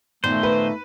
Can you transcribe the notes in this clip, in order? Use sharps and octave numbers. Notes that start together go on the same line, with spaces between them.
A#2 D#3 A3 B3 C5
B4